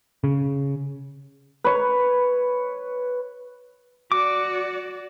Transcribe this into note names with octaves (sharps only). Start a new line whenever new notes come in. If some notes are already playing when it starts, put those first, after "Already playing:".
C#3
B4 C#5
F#4 D5 D6